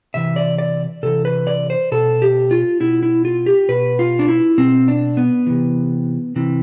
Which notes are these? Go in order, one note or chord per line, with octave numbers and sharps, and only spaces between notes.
C3 E3 E5
D5
D5
C3 E3 A4
B4
D5
C5
B2 A4
G4
F4
B2 E4
E4
F4
G4
B2 B4
F4
D4
E4
B2 C4
D4
B3
C3 E3
C3 E3